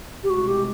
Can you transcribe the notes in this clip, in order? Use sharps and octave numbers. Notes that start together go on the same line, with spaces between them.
G4
C2 B2 G#3 F#4
G4